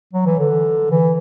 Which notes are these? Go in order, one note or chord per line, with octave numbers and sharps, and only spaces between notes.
F#3
E3
D3
E3